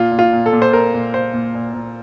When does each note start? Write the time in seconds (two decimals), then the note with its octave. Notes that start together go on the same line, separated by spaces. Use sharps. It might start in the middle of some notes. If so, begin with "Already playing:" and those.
Already playing: A#2 F4
0.12 A#2
0.19 F4
0.33 A#2
0.46 A4
0.53 A#2
0.62 C5
0.73 A#2 A#4
0.94 A#2
1.14 A#2 C5
1.33 A#2
1.55 A#2
1.74 A#2